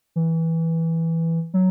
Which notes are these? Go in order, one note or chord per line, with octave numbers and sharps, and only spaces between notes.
E3
F#3